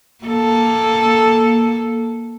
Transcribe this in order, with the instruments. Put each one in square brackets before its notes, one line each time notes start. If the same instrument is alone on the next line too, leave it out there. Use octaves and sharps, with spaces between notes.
[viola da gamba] A#3 A4